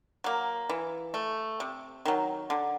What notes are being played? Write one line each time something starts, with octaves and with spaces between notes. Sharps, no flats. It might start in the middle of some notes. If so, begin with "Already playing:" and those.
F#3 A#3
E3
A3
C3
D#3 F#3
D3